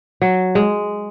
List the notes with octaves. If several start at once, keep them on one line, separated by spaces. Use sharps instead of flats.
F#3
G#3